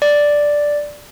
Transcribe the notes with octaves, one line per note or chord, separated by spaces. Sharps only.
D5